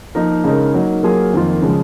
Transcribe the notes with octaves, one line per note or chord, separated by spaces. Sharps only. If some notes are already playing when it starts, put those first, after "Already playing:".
F3 A#3 D#4 A#4
C#3 G#3 D#4 A#4
F#3 A#3 D#4
F#3 A#3 F4 G#4
F2 D#3 A#3 F4
C#3 F3 G#3